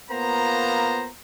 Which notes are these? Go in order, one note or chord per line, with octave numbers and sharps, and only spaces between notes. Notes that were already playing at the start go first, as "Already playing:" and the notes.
A#3 B3 F4 C5 A#5